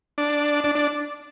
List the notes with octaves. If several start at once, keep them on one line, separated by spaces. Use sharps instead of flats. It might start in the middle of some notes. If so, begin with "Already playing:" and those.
D4
D4
D4